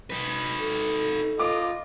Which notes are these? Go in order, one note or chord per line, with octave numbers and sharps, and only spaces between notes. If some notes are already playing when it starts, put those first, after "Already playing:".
D#4 B4
A4
F4 D#5 D6